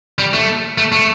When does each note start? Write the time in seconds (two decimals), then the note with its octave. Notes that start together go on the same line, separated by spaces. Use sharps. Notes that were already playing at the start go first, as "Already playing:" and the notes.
0.19 G3
0.34 A3
0.78 A3
0.92 A3